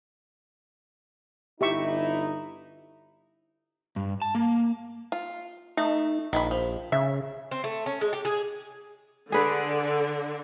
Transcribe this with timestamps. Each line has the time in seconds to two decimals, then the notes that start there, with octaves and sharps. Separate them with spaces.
1.61 G1 D#4 E4 G4 E5 C#6
3.96 G2
4.22 A5
4.35 A#3
5.12 F4
5.77 A3 D#4
6.33 A#1 D#3 B5
6.51 F3
6.92 C#3 E5
7.51 C4
7.64 A3
7.86 C#4
8.01 G#3
8.13 G4
8.25 G#4
9.32 D3 G#4 B4